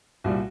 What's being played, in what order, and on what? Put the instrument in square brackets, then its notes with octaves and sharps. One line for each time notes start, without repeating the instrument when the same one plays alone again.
[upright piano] C2 A#2 G3 F#4